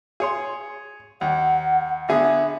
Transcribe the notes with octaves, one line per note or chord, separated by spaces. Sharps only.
G#4 C#5 C6
D#2 F#5
D3 B3 G#4 E5